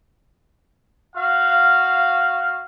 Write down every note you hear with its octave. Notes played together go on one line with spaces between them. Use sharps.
F#4 F5